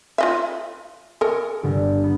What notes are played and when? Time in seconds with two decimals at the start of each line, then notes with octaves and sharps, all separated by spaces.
0.18 F4 D#5 E5
1.21 A4 A#4 G#5 C#6 D#6
1.63 G1 D3 G3
2.04 B3